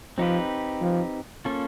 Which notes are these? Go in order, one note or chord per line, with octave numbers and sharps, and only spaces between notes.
F3 C4 D#4 G4 B4
F3
A#3 C#4 F4 A4